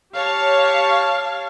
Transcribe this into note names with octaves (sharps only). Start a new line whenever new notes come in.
G4 C#5 F5 A5